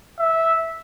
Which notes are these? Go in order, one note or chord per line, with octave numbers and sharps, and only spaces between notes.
E5